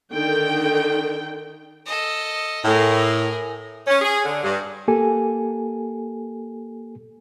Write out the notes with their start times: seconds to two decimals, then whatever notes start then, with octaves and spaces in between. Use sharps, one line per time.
0.12 D3 D#3 G5
1.86 A4 D#5
2.64 A2 G#4 A#4
3.87 C#4
4.01 G#4
4.25 D3
4.43 G2
4.88 A#3 G4 A4 G#5